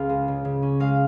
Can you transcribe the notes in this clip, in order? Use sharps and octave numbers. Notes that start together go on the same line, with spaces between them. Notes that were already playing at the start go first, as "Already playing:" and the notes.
Already playing: C#2 F5
G#3
C#3
C#3
C#4
G#3 F5